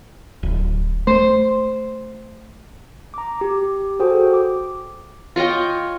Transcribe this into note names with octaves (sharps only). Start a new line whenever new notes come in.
D1
A3 C5
A#5 D6
G4
F#4 G#4 A4 C5 G5
D6
F4 C#5 D#5 G5